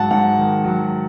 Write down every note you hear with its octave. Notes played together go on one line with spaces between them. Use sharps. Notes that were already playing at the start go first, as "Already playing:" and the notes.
Already playing: G#2 F#3 F#5 A5
G#2 F#5
D#3
F#3